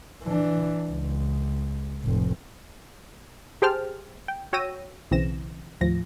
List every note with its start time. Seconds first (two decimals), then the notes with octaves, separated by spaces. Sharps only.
0.23 E3 D4
0.89 C#2
2.04 F1 A2
3.62 G4 G#4 C5 G5 A5 F6
4.28 G5
4.53 F#4 C#5 G5 E6 A#6 D#7
5.11 B1 C#3 E3 C4 A#6 E7
5.81 D#2 A2 F3 A#6